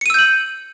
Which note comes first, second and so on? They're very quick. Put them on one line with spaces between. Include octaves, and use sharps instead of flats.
C#7 D#7 E6 G6 F#7